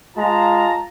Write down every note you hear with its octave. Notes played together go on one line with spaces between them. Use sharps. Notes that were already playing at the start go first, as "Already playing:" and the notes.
G#3 F4 A5 A#5